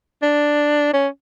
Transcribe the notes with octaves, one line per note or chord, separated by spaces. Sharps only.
D4
C#4